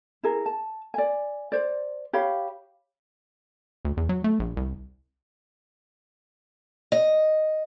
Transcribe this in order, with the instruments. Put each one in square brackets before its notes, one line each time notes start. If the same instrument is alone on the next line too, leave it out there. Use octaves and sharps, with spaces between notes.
[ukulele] E4 G#4 A#4
A5
D5 G#5
C5 D5
G4 C#5 F5 B5
[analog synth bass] D2
E2
F#3
A3
A#1
C2
[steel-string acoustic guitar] D#5